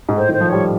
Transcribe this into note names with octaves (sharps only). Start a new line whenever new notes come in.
G#2
A2 C5
D#3 C5
F3
G3 C#5